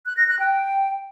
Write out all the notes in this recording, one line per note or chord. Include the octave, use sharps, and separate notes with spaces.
F#6
A#6
F#6
G5